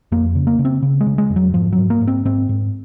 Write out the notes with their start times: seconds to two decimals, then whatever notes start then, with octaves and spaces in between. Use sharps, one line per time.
0.12 F2 A#3
0.35 C#3
0.47 A#3
0.59 C#3
0.65 C4
0.83 C#3
1.01 G#3
1.07 C#3
1.18 G#3
1.30 F2
1.36 F#3
1.54 G#2 F3
1.73 F#3
1.78 G#2
1.90 A#3
2.01 G#2
2.08 C4
2.25 G#2 C4
2.49 G#2